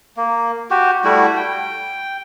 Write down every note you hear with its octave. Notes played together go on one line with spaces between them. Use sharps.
A#3
F#4 G4
G3 A3 E4 F#4
G5